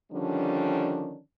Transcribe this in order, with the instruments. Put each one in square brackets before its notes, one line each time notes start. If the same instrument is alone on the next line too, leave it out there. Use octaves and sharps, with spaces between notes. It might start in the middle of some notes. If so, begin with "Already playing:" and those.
[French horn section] D3 D#3 F3 G3 C#4 D4